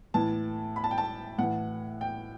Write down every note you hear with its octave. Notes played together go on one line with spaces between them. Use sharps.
A2 E3 A5
B5
A5
G5
A5
A2 E3 F#5
G5